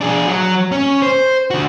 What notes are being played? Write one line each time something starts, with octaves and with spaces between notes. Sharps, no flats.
D4 G#4
F#3
C#4
C5
D3 F#4